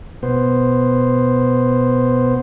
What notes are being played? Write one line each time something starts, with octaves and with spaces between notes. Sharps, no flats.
B2 B3 C5